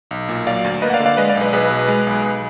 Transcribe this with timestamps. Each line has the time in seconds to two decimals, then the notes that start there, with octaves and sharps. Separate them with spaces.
0.11 B1
0.29 A#2
0.47 F#3 D5 F5
0.64 D2
0.82 A#3 B4 D#5
0.90 F#5
0.94 D5 F5
1.00 D3
1.06 D5 F5
1.17 G#3 B4 D#5
1.29 D5 F5
1.36 B1
1.41 B4 D#5
1.53 B1 G#4 B4
1.71 B2
1.88 G#3
2.07 B1
2.24 B1